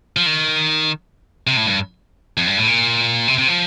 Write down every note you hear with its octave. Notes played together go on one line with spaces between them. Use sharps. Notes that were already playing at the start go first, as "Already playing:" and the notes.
F3
D#3
C3
A2
G2
F2
G2
A2
A#2
C3
C3
F3